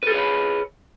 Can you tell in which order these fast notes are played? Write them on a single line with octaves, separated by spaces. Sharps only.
B4 A4 G#4 C#5 B5